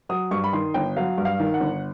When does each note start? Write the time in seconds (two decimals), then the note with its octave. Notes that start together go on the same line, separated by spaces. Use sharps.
0.09 F#3 D#6
0.31 G2 C#6
0.44 B5
0.53 D#3 C6
0.74 G1 G5
0.96 F#3 F5
1.18 G2
1.25 F5
1.39 D#3
1.54 F#5
1.61 G1